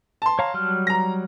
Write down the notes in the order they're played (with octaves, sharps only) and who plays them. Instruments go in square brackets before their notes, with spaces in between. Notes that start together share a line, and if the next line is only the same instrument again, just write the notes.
[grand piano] A5 C6
[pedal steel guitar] C#5 F5 A#5
F#3 G3 F6
[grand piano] A#5 A#6